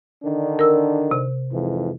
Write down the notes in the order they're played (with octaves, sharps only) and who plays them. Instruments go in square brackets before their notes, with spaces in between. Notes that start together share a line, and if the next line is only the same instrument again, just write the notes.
[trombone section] D3 D#3 D4
[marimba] A#4 E6
C3
[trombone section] F2 G#2 E3